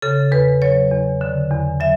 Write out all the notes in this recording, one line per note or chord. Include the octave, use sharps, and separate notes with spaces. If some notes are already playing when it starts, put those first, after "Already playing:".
C#3 A4
E2 B4
F#3 C#5
E2
D3
E2
F#3 E5